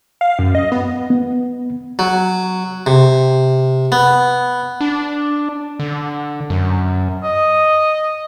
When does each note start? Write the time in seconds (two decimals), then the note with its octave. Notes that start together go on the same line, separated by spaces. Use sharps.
0.21 F5
0.39 F#2
0.55 D#5
0.72 B3
1.10 B3
1.99 F#3
2.86 C3
3.92 B3
4.81 D4
5.80 D3
6.50 F#2
7.24 D#5